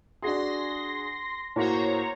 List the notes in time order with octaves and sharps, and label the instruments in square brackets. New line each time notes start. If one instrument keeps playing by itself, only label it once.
[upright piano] D4 F#4 G#4 [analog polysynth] C6 A#6
[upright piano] A2 A#3 F#4 [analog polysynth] C5 C#5 A#5